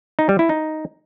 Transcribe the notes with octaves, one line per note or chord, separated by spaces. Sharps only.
D#4
G3
E4
D#4